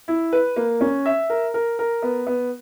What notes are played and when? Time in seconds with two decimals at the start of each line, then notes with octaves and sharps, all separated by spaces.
0.08 E4
0.33 B4
0.56 A#3
0.81 C#4
1.06 E5
1.30 A#4
1.54 A#4
1.79 A#4
2.03 B3
2.27 B3